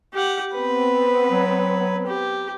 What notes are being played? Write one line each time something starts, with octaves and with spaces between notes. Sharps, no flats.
G4 F#5
B3 C4 B4
F#3
G4